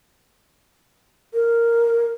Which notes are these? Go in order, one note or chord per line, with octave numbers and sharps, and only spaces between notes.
A#4